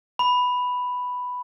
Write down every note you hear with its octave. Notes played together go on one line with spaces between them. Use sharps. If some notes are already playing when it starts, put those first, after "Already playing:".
B5